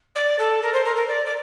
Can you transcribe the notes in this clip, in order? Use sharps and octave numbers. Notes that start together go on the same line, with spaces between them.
D5
A4
A#4
C5
A#4
A#4
D5
D5